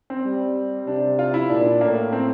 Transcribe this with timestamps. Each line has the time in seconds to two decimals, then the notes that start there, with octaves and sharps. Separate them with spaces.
0.10 C4
0.25 G3
0.87 C3 D4
1.19 F4
1.34 E4
1.50 A#2 D4
1.65 D4
1.81 A2 A#3
2.12 C4